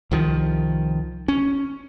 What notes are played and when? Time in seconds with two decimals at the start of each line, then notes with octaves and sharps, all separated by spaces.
0.11 C2 D#3 F3
1.28 C#4